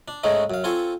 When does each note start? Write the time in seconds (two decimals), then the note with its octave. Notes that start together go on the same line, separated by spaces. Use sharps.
0.08 D4
0.24 G#2 G#3 A3 C#4 D#4
0.50 F#2 F5
0.64 C4 F4 A4 G#5 C#6